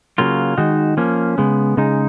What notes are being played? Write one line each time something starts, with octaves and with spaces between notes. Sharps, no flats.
C#3 F#3 A#3 F4
D#3 G#3 D#4 F#4
F3 A#3 C#4
C#3 G#3 B3
C#3 G#3 D#4